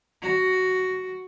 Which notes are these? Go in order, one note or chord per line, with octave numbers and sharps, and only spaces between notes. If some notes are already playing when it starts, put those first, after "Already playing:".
F#4